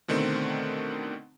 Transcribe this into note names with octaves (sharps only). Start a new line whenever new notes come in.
B2 D3 D#3 A3 C4